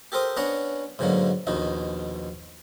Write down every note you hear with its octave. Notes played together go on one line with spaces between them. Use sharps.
G4 A4 A#4 C5 D#6
B3 C#4 D4 F#5 A#5
G#2 B2 D3 F#3 A#3
A#1 D#2 B2 D#4